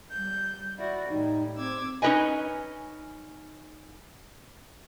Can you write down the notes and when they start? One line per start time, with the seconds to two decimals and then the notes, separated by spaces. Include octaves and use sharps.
0.11 G3 G6
0.78 E4 F#4 D5
1.10 A2 G3 D#4
1.58 C4 D6 E6 G#6
2.02 C#4 D#4 G4 B4 D#5 G#5